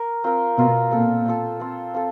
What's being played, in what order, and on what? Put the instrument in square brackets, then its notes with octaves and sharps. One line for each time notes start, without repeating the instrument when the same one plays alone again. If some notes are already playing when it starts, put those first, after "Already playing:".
Already playing: [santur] A#4
C4 F4 A#4
[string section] B2 [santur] C4 F4 A#4
[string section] A#2 [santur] C4 F4 A4
[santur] C4 F4 A4
C4 F4 A4
C4 F4 A4